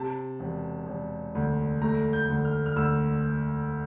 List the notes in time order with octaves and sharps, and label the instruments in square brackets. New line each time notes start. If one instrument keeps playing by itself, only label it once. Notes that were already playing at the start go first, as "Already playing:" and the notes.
Already playing: [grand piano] C3 A5
E1
E1
D2
A3 A#5
G6
D2
F6
F6
D2 E6